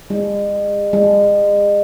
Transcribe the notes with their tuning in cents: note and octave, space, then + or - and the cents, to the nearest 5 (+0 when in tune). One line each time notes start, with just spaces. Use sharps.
G#3 -40
G#3 -40